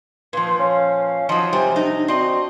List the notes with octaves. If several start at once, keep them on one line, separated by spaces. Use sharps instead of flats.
A#2 F3 B4
C#4 F5
F3 F#3 D#4
C3 G3 G#5
D4 D#4
C4 D4 F#4 D#5